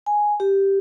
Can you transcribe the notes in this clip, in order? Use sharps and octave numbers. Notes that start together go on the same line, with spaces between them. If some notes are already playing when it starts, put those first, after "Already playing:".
G#5
G4